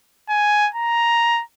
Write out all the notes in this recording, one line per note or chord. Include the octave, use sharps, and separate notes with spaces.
G#5
A#5